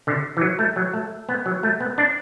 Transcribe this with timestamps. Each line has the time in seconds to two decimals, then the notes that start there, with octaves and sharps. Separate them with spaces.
0.07 D3
0.37 E3
0.41 F#3
0.59 A3
0.76 F#3
0.93 A3
1.29 B3
1.46 F#3
1.63 A3
1.80 B3
1.98 D4